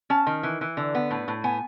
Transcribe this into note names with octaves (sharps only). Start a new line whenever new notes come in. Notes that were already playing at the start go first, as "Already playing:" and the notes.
C#4 A5
D#3
E3
E3
D3
B3
A2
A2
B3 G#5